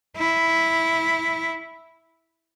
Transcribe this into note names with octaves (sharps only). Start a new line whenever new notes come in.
E4